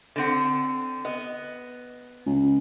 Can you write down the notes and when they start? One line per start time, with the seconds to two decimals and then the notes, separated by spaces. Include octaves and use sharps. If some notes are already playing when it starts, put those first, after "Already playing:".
0.16 D3 C4 F#5
1.05 B3 D#5
2.26 C#2